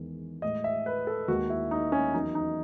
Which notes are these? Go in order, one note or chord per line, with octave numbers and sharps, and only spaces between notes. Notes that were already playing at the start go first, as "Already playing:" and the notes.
Already playing: E2 D#3 G#3
A2 G#3 D#5
E5
B4
A4
D#2 D#3 G#3 F#4
E4
D#4
C#4
E2 D#3 F#3 D#4
D#4